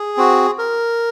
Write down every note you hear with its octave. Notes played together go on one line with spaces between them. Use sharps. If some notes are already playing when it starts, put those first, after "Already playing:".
Already playing: G#4
C4 F#4
A#4